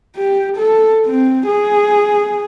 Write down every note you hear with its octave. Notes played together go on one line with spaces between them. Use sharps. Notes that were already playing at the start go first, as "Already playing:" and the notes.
G4
A4
C4
G#4